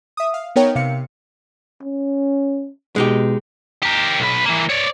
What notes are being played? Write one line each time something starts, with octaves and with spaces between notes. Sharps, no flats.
E5 D#6
F5
B3 D#4 A#4 C#5 G5
C3 F5 C#7
C#4
B2 G#3 D#4 G4
G4 A#4
B1 B4
E3 A#3
C#5 D5